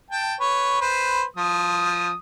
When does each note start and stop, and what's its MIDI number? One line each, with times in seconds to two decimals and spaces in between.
0.10 0.35 79
0.10 0.35 81
0.40 0.77 71
0.40 0.77 73
0.81 1.23 71
0.81 1.23 72
1.36 2.14 53
1.36 2.14 87